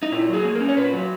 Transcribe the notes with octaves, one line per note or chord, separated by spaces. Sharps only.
D#4
A#2 E4
F#3
G#4
A#3
A#4
C#4
C#5
A#2 B4
F#3